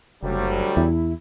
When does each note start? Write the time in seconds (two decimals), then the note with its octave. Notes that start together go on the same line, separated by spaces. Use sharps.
0.23 F#1 D2 F#3 G3
0.77 E2 E4